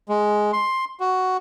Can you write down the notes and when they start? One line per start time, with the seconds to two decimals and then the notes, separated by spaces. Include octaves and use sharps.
0.09 G#3
0.53 C6
1.00 F#4